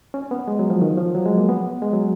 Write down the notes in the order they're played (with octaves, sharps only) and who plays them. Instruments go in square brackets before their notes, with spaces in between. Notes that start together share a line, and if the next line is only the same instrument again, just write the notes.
[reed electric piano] C#4
B3
G#3
F#3
F3
D#3
F3
F#3
G#3
A#3
B3
G#3
F#3